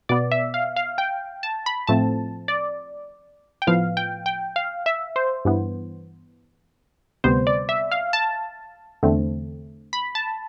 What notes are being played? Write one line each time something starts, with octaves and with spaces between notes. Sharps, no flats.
B2 B3 D5
E5
F5
F5
G5
A5
B5
A2 F3 A3 C4 A5
D5
G5
A2 F3 B3 F5
G5
G5
F5
E5
C5
G2 E3 B3
D2 C3 G3 B3 C5
D5
E5
F5
A5
E2 D3 A3 C4
B5
A5